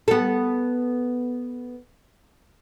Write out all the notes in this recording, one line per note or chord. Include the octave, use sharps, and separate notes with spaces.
B3 A4